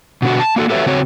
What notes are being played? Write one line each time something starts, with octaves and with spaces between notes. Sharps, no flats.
B2 D3 F#4
A5
A#3 F#4 A4
F#4 G4 A4 B4 C#5 E5
C#3 C4 F#4 C#5